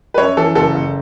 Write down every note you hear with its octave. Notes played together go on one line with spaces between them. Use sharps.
B4
F#2 C#5
E3 A4
F#1 A4
F#1